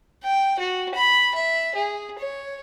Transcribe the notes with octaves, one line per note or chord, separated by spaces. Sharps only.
G5
F#4
B5
E5
G#4
C#5